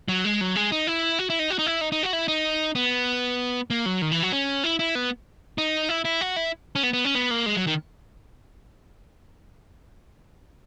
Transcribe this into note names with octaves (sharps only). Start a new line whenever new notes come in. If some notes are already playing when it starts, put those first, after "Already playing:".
F#3
G#3
F#3
G#3
D#4
E4
F#4
E4
D#4
F#4
D#4
E4
D#4
D#4
F#4
E4
D#4
B3
A#3
F#3
D#3
E3
F#3
C#4
E4
E4
B3
D#4
E4
E4
F#4
E4
C#4
B3
B3
C#4
B3
A#3
G#3
F#3
D#3